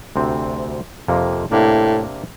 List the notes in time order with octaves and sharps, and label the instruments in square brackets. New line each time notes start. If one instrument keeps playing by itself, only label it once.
[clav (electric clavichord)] D2 C3 C4
F2 C3 A#3
[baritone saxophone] A2 [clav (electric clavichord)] C3 A#3 D4